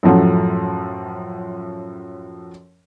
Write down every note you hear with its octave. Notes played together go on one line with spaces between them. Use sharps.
F#2 A2 F3 F#3